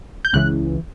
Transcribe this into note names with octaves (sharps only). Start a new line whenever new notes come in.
G6
C#2 C#3 E3 F#6